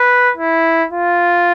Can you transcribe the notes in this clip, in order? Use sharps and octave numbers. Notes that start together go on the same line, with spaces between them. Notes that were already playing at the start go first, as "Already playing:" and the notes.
Already playing: B4
E4
F4